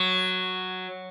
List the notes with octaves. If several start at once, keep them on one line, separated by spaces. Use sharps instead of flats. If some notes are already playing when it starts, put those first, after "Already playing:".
Already playing: F#3